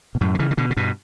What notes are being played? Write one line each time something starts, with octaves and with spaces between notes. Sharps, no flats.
B2
F#2 A2
D3
C#3 E3
E3
B2 D3
C#3
G2 B2